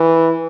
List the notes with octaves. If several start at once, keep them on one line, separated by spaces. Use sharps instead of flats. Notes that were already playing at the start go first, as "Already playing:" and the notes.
Already playing: E3